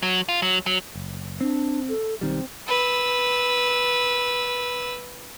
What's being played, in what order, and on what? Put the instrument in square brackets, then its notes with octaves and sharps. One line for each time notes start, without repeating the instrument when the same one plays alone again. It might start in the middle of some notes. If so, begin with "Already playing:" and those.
[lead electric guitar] F#3
F4
F#3
F#3
[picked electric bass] F#1
[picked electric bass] C4 [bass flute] D4
[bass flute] A4
[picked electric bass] B1 D#3 G3 [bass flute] C4
[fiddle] B4 E6